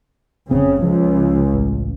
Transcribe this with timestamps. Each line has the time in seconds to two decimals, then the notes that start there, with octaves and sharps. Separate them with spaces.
0.51 F1 C#3 C4
0.82 C#2 F3
1.53 A1